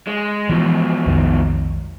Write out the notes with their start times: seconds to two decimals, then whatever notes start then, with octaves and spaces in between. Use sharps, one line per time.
0.07 G#3
0.49 G#2 B2 E3 F3
1.06 B1 F2 D#3